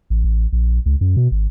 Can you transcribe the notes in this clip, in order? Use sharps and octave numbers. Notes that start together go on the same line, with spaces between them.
A1
A1
A#1
C#2
F#2
B2
G#1